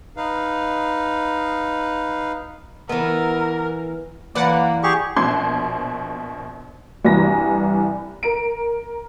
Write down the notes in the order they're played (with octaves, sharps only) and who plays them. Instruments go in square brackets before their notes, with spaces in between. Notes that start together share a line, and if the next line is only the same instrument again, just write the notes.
[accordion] D#4 B4 F5
[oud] E3 B3 [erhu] A#4
[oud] F#2 E3 B4 [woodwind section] A#3 [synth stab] D5 F#5
[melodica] G4 G#4 C#6
[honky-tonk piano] A#1 B2 C5 C6 G#6 C7
C2 G2 E3 G#5 A#5 A#6
A#4 A#5 D7